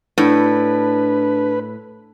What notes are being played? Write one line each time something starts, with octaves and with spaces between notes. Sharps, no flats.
A2 D4 B4